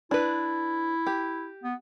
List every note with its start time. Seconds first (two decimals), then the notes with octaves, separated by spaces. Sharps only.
0.11 D4 E4 B4
1.07 G4
1.64 B3